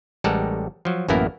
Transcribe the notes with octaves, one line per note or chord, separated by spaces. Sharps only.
A1 G3 G#3 A4 A#4 F#5
F3 F#3
A1 F#2 A#3 B3 E4 A#4